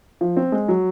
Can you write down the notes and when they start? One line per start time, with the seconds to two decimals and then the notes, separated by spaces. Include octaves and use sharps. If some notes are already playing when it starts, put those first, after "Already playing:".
0.21 F3
0.37 C4
0.52 G#3
0.68 F#3